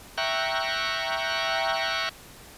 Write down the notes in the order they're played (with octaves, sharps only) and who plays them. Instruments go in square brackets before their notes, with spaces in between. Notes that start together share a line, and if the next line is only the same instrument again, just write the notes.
[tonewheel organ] E5 G5 A#5 C#6 F#6